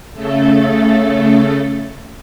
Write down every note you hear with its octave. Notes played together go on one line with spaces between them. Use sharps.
C#3 A3 A4